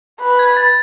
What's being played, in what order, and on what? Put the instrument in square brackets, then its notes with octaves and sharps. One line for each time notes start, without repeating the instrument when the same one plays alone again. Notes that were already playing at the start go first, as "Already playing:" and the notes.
[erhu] B4
[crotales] G#6
A6